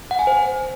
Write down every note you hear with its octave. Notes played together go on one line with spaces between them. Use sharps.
F#5
G#5
C5